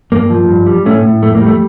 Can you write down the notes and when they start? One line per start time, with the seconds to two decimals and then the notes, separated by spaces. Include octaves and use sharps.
0.12 G2 A#3
0.30 F3
0.48 G2
0.66 G3
0.85 A2 A3 C#4
1.03 A2
1.22 F2 A3
1.34 A#3
1.41 G3
1.46 A3